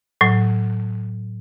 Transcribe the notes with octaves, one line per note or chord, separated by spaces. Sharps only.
A2 F#3